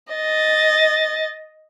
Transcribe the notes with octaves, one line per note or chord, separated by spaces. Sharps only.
D#5 A6